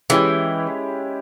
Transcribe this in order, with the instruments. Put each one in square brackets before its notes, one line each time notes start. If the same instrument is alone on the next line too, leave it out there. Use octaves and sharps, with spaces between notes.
[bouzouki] E3 [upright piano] G#3 C#4 E4 G4